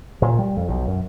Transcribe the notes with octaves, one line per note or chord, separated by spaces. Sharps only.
A#2
G3
F2
B1
F#2